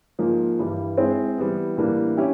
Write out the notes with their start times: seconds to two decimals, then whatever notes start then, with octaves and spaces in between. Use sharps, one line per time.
0.19 G#2 F3 A#3
0.59 G2 E3 G3
0.98 G#3 C4 E4 G#4 C5
1.38 E3 G3 B3
1.77 A2 E3 G3 A#3 D4
2.17 C#4 E4 G4